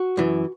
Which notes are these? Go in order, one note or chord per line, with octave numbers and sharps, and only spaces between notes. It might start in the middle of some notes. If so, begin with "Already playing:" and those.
Already playing: F#4
F#2 E3